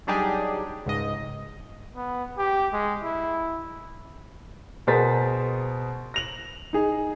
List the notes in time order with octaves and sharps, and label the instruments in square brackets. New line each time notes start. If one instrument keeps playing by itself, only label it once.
[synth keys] F#3 G3 D4 D#4 G4 G#4
C#2 G#2 D#5
[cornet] B3
G4
G#3
E4
[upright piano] B2 G#4 A#4 C5 A6 B6
A#6 F7 F#7
D#4 G#4